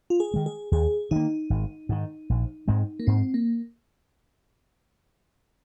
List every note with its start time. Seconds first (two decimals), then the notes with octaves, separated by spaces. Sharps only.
0.10 F4
0.20 G#4
0.34 D#3 G#3
0.46 G#4
0.72 D#2 G#4
1.11 D#3 A#3 D#4
1.50 G#1
1.89 G#2 D#3
2.30 A#1
2.68 G#2 G#3 C4
3.00 A#3
3.07 G#2 C4
3.34 A#3